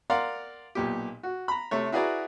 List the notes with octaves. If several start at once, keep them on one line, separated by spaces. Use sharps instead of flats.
A#4 D5 F5 F#5 A#5 C6
B1 A#2 G4
F#4
A#5 B5
C3 A3 C#5
E4 F#4 G#4 B4 D5 A#5